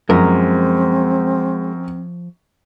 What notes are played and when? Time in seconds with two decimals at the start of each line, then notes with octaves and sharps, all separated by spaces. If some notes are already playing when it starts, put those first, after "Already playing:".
0.10 F#2 F3 G#3 C4 A#4